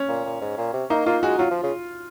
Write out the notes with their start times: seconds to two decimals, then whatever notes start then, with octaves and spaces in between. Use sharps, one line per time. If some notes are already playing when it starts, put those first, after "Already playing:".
Already playing: C#4
0.09 A#2
0.25 A#2
0.42 G#2
0.58 A#2
0.73 C3
0.90 A#3 D#4
1.06 A#3 F4
1.23 G#3 F#4
1.39 F#3 F4
1.51 F3
1.63 C#3